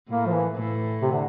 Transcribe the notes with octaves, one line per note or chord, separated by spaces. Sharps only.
A2 A#3
F3
E3
A2
C3
D3